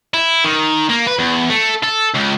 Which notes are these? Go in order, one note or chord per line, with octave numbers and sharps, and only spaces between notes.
E4
D#3
A#3
B4
E2
A3
A4
C#2